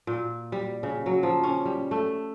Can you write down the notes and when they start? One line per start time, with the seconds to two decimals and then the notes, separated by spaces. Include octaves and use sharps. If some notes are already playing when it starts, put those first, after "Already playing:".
0.07 A#2
0.52 G3
0.83 C#3
1.06 F#3
1.23 F3
1.43 C#4
1.65 G3
1.91 A3